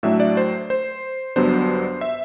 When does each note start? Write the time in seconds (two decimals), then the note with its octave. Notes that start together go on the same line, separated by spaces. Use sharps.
0.03 A2 F#3 A3 D4 E5
0.20 D5
0.37 C5
0.70 C5
1.36 G1 G2 F#3 B3 D4 C5
2.01 E5